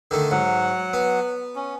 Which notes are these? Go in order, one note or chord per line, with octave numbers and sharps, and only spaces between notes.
D3 D#3 A3
G#2 F#3 F#5
B3
C#4